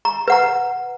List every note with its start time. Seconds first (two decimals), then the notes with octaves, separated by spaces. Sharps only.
0.05 A#5
0.28 B4 F#5 A#5